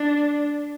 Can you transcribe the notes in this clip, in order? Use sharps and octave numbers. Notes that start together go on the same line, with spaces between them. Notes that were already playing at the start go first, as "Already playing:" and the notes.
Already playing: D4